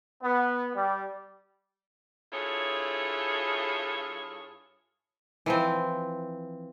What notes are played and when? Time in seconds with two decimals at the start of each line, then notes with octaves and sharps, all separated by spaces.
0.22 B3
0.75 G3
2.33 G2 E4 F4 G#4 A4 C#5
5.46 E3 F3 C4